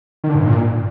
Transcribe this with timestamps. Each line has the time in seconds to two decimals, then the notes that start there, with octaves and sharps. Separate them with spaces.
0.24 D#3
0.29 D3
0.35 G#2
0.40 G2
0.46 A#2